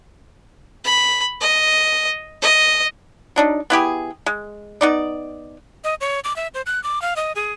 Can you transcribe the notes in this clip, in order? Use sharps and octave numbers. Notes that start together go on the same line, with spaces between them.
B5
D#5
D#5
F#3 D4 D#4
B3 E4 G4 G#4
G#3
B3 D#4 D5
D#5
C#5
D6
E5
C5
F#6
D6
F5
D#5
G#4